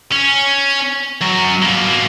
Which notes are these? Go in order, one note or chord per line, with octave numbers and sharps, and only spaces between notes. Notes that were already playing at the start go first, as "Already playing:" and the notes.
C#4
F#2 F#3
B2 A#3